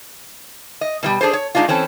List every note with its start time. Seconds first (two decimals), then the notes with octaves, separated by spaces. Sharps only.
0.81 D#5
1.03 B2 F3 G3
1.21 D4 G#4 A4 C5
1.33 C#5
1.55 G#2 G#3 A#3 D4 D#4 F4
1.68 E3 C4 C#4 A4